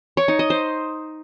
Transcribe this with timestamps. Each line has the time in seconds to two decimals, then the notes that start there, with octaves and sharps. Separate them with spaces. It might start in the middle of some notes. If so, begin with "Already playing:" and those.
0.17 C#5
0.28 D#4
0.39 D#5
0.50 C5